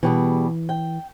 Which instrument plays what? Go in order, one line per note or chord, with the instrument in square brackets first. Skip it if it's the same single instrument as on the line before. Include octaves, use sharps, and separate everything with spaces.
[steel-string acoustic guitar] B2 G3 G#4 [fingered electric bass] E3
[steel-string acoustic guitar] G5